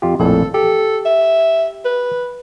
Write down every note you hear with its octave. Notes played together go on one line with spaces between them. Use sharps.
F2 F4 G4
A#1 F2 A2 A4
G4 A4
E5
B4